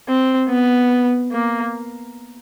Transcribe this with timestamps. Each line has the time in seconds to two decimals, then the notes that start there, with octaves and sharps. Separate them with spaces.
0.08 C4
0.49 B3
1.32 A#3